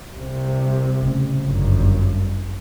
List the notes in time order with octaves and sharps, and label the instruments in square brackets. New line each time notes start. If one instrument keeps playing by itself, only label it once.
[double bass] C2 C3
[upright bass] A2 C#3
[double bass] G1 F#2
[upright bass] G3